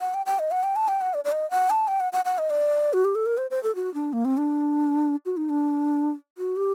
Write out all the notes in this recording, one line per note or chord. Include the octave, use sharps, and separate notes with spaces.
F#5
G5
G5
D#5
F#5
G5
A5
G5
F#5
D5
D5
D#5
F#5
A5
G5
F#5
F#5
F#5
D#5
D5
F#4
G4
A4
A#4
C5
C5
A4
F#4
D4
A#3
C4
D4
F#4
D#4
D4
F#4
G4